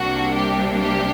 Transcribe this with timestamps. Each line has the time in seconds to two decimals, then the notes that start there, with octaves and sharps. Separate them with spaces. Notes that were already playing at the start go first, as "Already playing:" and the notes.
Already playing: C2 C3 G3 A#3 D4 F#4
0.35 G4
0.79 G4